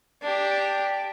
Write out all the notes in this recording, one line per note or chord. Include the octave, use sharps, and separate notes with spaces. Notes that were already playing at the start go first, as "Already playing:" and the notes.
D4 G4